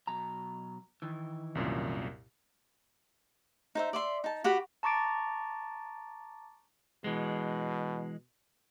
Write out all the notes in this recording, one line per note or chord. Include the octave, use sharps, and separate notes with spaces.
B2 F#3 A#5
D#3 E3
C2 F#2 A#2
D#4 C5 E5
D5 E5 C6
D#4 A5
F#4 G4 F#5 B5
A5 A#5 C#6 D6 A6 D7
B2 E3 G#3